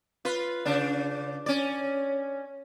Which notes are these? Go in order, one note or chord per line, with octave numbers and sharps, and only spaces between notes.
F4 B4
C#3 D4
C#4 D5